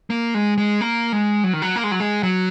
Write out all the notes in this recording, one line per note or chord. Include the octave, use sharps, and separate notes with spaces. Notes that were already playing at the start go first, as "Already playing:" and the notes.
A#3
G#3
G#3
A#3
G#3
F#3
D#3
F#3
A#3
G#3
F#3
G#3
F#3